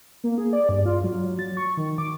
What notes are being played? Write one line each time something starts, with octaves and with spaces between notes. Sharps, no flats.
A#3
G#4
D5
G2
F4
F#3
F#3
A6
C#6
D#3
D6